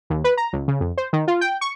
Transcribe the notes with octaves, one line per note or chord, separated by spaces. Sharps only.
D#2
B4
A#5
C#2
C#3
F2
C5
D#3
F4
G5
C#6